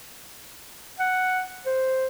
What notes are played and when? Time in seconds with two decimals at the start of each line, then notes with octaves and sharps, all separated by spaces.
0.99 F#5
1.66 C5